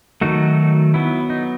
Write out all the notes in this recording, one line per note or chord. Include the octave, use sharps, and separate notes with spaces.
D#3 F#3 A3 D#4 F#4
F#3 B3 E4
D#4